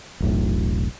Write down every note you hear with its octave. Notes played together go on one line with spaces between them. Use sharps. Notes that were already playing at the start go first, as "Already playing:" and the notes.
E1 B1 A2